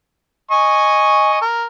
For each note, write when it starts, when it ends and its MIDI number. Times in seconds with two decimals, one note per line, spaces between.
0.51 1.40 75
0.51 1.40 80
0.51 1.40 85
1.42 1.65 70